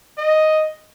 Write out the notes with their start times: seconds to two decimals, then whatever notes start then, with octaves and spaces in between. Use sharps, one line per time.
0.18 D#5